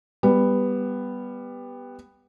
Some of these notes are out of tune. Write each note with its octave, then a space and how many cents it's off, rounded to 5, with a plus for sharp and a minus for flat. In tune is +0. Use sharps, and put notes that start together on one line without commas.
G3 +15 B3 +0